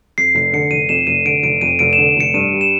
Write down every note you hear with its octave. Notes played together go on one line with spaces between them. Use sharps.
F2 C7
F1 C7
D3 C#7
F1 D#7
F2 E7
F1 D#7
D3 D7
F1 D7
F2 D#7
F1 D7
E7
D3
F1 C#7
G2 D#7
G3
E7